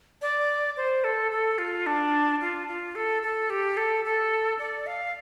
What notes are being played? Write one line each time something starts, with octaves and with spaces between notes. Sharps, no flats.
D5
C5
A4
A4
F4
D4
F4
F4
A4
A4
G4
A4
A4
D5
F5